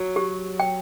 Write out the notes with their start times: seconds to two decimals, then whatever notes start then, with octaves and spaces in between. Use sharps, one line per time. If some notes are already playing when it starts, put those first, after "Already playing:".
Already playing: F#3
0.16 G4
0.60 G5